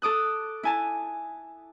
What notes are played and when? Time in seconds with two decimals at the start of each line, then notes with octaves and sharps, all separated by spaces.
0.02 A4 D6 D#6 F#6
0.63 E4 G#5 A5